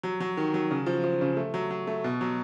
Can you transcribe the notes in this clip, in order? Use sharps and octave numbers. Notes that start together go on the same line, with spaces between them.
F#3
F#3
D#3
F#3
C#3
F3
F3
C#3
A3
F#3
F#3
A3
B2
F#3